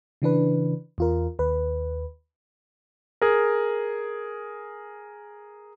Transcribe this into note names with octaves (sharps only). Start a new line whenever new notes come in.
C#3 E3 D4 B4
E2 F4 A#4
D#2 B4
G#4 A#4